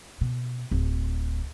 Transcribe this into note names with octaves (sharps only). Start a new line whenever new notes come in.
B2
D1